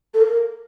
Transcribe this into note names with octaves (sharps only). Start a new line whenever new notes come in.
A4
A#4